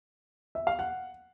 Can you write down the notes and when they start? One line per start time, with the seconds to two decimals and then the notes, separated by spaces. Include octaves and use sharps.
0.55 E5
0.67 F5
0.79 F#5